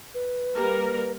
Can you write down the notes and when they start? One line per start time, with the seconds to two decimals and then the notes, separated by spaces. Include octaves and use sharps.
0.14 B4
0.55 G3 A#3 A#4